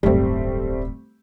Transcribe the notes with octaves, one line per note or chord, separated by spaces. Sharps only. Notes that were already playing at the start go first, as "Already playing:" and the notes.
D1 G1 G3 A3 C4